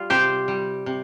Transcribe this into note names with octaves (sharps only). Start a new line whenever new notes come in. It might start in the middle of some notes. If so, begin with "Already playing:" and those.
Already playing: G3 F4
C3 G4 C5
G3
C3